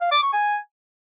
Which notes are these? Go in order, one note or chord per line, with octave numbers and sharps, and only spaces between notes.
F5
D6
C#6
G#5